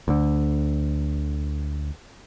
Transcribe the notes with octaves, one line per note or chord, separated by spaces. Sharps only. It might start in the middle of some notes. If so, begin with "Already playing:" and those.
D2 D3